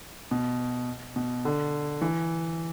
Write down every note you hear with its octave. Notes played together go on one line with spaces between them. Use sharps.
B2
B2
D3
E3